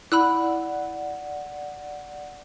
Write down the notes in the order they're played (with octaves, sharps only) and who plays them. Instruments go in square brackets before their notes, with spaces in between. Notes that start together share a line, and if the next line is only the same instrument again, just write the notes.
[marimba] E4 [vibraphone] D5 F#5 [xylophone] B5 E6 F#6